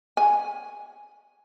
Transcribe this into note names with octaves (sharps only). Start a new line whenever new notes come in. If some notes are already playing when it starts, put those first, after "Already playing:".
G#5